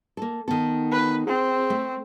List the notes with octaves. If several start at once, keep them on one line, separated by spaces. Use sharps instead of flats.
A#3 A4
D#3 B3 A4
B4
C4 G#4
A3